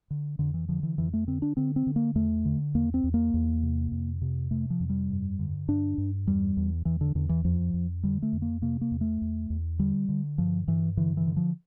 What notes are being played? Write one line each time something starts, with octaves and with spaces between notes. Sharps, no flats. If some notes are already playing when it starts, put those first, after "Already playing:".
D3
F2 D3
E3
D3 F3
E3
F2 E3
A3
D3 C4
D4
D3 C4
C4
D3
A#3
E2 A3
D3
E2 A#3
C4
E2
A#3
E2
C3
F2
C3
C3 A3
F3
F2
G3
G2
D3
G2 D4
G2
E2 G3
E2
E2 E3
D3
E2 D3
E3
F2 F3
F2
D3 G3
A3
F2
A#3
C3 A#3
A#3
E2
A3
E2
E2
D3 G3
D3
G2 F3
G2 E3
D3 E3
E3
D3
F3